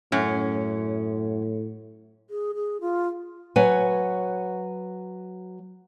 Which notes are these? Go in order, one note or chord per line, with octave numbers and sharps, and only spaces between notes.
F#2 A2 C#4
G#4
G#4
F4
F#3 B4 C#5 G#5